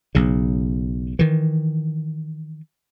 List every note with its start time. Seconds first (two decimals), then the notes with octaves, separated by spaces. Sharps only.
0.15 B1 C#3
1.19 D#3 E3